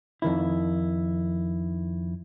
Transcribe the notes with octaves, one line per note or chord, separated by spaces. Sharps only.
F2 D#3 E4